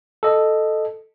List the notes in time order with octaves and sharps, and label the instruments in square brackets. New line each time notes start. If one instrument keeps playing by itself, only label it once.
[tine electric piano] A4 D#5